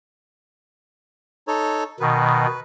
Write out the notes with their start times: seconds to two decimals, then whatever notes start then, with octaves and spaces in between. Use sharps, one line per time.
1.48 D#4 A4 C#5
2.00 B2 D#3 B4